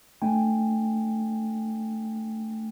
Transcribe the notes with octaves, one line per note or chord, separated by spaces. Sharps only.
A3 D4 G5 G#5